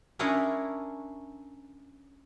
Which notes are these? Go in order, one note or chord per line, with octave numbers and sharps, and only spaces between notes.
C#4 D4 E4 G#4 A#4 C#5